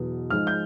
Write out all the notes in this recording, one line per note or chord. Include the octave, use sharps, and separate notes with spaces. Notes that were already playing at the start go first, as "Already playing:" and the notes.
Already playing: E2 B2 F#3
G#2 F3 G#3 F6
G6